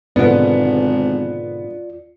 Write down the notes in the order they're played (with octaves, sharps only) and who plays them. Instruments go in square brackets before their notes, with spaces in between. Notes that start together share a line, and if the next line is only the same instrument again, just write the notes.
[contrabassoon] G#1 [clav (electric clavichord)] G#2 B2 D3 [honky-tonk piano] B3 [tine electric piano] F4 D5